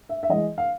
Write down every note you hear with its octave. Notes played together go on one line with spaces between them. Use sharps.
E5
E5
E3 G#3 D#5
F5